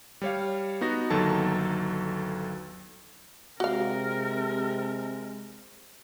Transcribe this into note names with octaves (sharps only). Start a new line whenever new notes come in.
G3 C#5 F5
B3 D#4 F#4 A#6
G1 D#2 F#3 D#4 A4 A5
C3 G#3 C4 F#4 A#4 F5